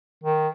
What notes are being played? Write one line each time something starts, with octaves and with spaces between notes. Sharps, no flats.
D#3